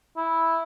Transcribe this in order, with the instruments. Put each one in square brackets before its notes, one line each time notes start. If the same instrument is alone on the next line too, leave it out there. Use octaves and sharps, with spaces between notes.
[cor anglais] E4